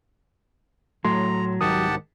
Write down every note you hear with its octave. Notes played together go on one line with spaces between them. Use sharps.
A2 F#3 A3 A#5 C6
C2 G#2 D#3 G4 F#5 A5 D#6